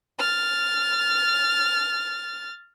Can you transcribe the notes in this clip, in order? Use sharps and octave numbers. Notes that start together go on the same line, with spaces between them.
F6 A6